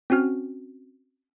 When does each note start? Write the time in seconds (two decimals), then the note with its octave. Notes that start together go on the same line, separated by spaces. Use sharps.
0.10 C4 C#4 F#4 F6